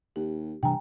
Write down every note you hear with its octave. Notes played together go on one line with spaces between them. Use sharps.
D#2 G4
G2 C3 E3 G3 G5 G#5 A#5